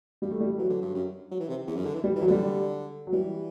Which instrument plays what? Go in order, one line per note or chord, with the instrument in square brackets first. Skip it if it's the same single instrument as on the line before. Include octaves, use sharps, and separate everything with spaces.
[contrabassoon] G2 [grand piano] G3
[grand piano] A3
[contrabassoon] A2 [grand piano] G3
[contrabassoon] E3 [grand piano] F#3
[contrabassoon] D3
G2
F#2
F#3
E3
C3
E2
F#2
D3
E3
[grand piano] G3
[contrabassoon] E3
[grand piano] F#3
[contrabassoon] D3 [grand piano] G3
[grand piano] F#3
[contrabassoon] E3 [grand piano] G3